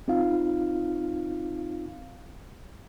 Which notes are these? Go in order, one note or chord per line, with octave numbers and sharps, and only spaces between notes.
C4 D#4 F4 F5